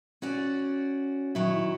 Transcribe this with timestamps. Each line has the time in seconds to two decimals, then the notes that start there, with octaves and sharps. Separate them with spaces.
0.22 C#4 F#4 D5
1.35 D#3 F#3 E4